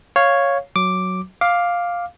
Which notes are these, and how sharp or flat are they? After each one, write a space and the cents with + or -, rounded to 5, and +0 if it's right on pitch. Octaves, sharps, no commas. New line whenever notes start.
C#5 +0 F5 +0
F#3 +0 D6 +0
F5 +5 D6 +0